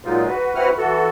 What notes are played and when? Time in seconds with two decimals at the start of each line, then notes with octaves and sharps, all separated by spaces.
0.05 A#2 F#3 G#3 A#3 D#4 F4
0.27 F#4 B4
0.55 C4 E4 F#4 B4 F#5 F6
0.78 E3 F#4 A4